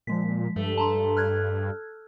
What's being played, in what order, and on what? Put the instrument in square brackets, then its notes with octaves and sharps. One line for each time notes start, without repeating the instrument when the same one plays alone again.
[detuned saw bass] A#2 [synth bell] F3 G#3 B6
[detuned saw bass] G2 [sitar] A3
[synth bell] A5 A#5 C6
F6 F#6 G#6